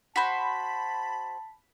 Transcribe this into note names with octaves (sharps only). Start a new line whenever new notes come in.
F#4 C5 A5 B5 B6